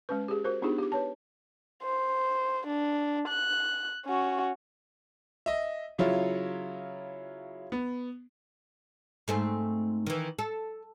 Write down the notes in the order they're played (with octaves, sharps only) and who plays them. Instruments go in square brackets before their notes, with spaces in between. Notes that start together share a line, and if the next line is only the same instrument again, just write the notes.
[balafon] G#3 C#4 B4
G4 G#4
F#4 A#4 C5
B3 D4 D#4 F4 G4 G#4
G4 D6
B4 C#5 A5
[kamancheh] C5
D4
F#6
C#4 F#4
[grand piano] D#5 E5
C#3 F#3 E4 F4 C#5
B3
[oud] G#2 A3 C4
D#3 E3
A4